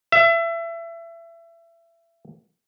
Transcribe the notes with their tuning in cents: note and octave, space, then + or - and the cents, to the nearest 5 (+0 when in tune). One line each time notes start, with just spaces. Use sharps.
E5 +25